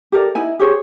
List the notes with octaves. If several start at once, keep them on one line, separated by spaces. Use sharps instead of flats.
G4 A4 A#4 D5
D#4 E4 G#5
G4 G#4 C5 C#5